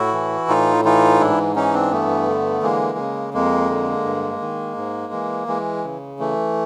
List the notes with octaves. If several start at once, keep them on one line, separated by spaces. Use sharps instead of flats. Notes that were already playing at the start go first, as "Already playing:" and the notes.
Already playing: A2 E4 F#4
E3
A2 D#4 F4
E3 D#4 F4
G#2 D4 E4
E3 C#4 D#4
C4 D4
G2 A3 B3
D3
E3 G#3 A#3
C#3
F2 G#3 A#3
D3
G2
D#3
G#2
E3
E3 G#3
C#3
E3 A3